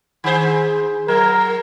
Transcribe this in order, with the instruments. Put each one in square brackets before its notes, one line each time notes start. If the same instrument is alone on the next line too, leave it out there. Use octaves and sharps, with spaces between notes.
[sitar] D#3 G#4 C5
[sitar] F#3 [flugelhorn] A#4